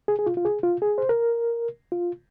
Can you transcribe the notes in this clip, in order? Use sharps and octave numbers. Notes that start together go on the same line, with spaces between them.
G#4
G#4
F4
F4
G#4
F4
G#4
C5
A#4
F4